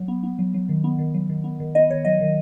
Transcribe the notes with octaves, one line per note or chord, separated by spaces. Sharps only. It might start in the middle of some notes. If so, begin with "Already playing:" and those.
Already playing: F#3
B3
B3
F#3
F#3
D#3
B3
D#3
F#3
D#3
B3
D#3
B3 D#5
D#3 C#5
F#3 D#5
D#3